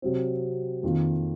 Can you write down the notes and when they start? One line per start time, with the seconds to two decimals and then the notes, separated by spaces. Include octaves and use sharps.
0.02 C3 F#3 C4
0.83 F2 D#3 A#3 F4